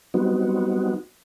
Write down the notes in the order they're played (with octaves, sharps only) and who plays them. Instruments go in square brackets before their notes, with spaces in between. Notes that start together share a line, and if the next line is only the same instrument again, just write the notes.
[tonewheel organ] F#3 G3 B3 C4 D#4 F#4